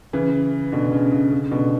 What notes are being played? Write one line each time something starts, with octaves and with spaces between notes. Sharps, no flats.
C#3 E3
B2 D3
C#3
C#3
C#3
B2 D3